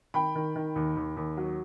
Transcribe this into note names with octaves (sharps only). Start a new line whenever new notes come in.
D#3 G5 B5
D#3
D#3
D#2
D#2
D#2
F#3